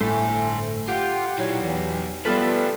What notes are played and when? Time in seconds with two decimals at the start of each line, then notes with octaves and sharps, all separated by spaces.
0.01 G1 A2 A3 C5 G#5
0.88 F4 G4 F5 F#5
1.38 A#2 F#3 D#4 E4 C#5
1.60 E2 E3
2.25 G3 A3 B3 F4 G4 A4 B4